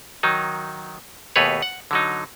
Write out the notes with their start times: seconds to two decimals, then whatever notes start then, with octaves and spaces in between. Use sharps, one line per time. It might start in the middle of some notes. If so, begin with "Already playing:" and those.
0.23 D#3 F#3 D#4
1.36 D#2 B2 A3 G#4 B4 C#5
1.62 F#5
1.91 D3 F#3 D#4